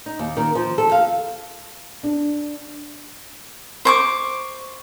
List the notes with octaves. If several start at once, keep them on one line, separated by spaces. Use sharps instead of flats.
D#4
D#2
D#3
F3
A4
F5
D4
C5 C#6 D6